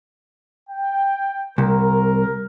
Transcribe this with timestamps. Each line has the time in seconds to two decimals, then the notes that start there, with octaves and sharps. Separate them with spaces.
0.68 G5
1.58 C2 A#4